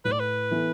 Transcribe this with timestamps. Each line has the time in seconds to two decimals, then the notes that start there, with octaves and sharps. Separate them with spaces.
0.05 A2 B4
0.12 D5
0.20 B4
0.51 E3 B3 E4 A4